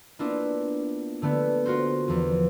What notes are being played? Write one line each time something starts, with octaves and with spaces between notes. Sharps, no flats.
A#3 B3 D4 E4 F4
D3 A3 B3
F4 F#4 A#4 C5
E2 F3